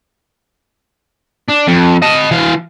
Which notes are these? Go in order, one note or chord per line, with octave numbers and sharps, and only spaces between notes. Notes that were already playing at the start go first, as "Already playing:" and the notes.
D4
F2
D#5 A5
E3 F5